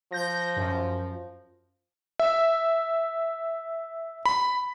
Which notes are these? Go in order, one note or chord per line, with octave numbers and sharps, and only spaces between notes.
F3 G6 A#6
F#2
E5
B5